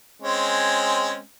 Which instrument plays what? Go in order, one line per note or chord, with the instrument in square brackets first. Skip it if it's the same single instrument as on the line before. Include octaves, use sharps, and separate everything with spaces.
[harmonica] G#3 C4 C#4